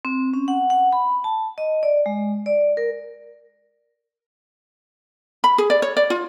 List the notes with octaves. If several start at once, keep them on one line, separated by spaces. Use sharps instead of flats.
C4
C#4
F#5
F#5
B5
A5
D#5
D5
G#3
D5
A#4
B5
G#4
D5
C#5
D5
F4